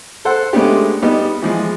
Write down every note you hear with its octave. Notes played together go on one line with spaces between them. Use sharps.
A4 C5 F#5
G#3 A3 B3 C#4 D4 G4
G3 B3 D#4
E3 F3 G#3